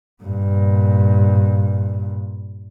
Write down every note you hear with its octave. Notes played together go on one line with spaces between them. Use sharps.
G2 A#2